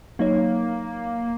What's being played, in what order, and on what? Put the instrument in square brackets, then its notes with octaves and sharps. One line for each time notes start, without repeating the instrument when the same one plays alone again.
[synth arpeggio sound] F#3 D#4 C#5 [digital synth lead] A#3